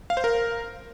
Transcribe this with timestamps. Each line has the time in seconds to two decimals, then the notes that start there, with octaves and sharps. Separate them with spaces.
0.10 F5
0.17 C5
0.24 A#4